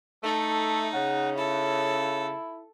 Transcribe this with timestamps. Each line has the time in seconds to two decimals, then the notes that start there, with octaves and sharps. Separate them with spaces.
0.24 A3 D#4 A4
0.93 C#3 F#5
1.37 E4 A4